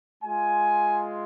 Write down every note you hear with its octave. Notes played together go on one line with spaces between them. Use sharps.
G#3 F4 G#5